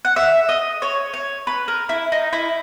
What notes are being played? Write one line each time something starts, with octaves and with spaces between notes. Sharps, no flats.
F#5
E5
D#5
C#5
C#5
B4
A#4
E4
D#4
E4